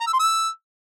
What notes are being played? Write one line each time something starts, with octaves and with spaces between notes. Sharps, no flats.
A#5
E6
C6
E6